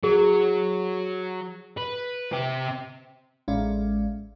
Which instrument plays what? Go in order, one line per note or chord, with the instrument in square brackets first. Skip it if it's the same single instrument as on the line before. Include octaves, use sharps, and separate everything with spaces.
[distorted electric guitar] F#3 [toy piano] G#4
[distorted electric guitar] B4
C4 G4
[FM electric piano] A1 G#3 C#4 D5 E5 F5